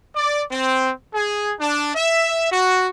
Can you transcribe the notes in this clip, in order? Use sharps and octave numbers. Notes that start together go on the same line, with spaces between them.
D5
C4
G#4
D4
E5
F#4